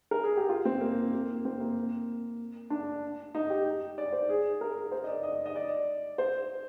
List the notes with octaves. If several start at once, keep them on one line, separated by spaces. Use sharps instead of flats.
A#4
G#4
G4
F4
C4
A#3
A#3
C4
A#3
D4
D#4
G4
D5
C5
G#4
A#4
C5
D#5
D5
D#5
D#5
D5
C5